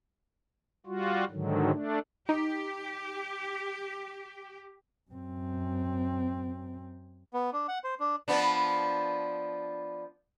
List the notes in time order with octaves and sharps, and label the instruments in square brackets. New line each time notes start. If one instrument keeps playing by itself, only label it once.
[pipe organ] G3 F4 F#4
G#2 D3 D#3 F#3
A3 D4
[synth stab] D#4 [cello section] G4
[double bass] F#2 C4
[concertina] B3
D4
F#5
C5
D4
[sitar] F3 B3 D4